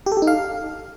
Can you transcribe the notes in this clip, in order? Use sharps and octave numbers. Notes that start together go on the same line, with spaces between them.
G4
A4
G4
D#4
F5